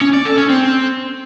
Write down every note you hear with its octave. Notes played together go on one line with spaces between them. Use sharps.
C#4
D5
A4
C#4
C4